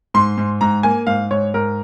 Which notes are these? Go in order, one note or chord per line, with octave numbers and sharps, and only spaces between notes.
G#2 C6
G#2
G#2 A#5
A#3 G#5
G#2 F5
G#2 C#5
G#2 A#4